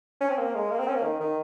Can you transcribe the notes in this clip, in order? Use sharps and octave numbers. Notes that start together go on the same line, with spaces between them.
C#4
C4
A#3
G#3
A#3
C4
C#4
A#3
D#3
D#3